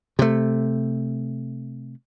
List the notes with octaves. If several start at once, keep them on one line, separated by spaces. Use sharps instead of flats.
C3 A3